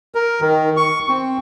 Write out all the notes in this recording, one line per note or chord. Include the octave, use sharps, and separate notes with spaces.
A#4
D#3
C#6
C4